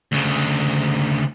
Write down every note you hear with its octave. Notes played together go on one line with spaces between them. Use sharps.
D2 C#3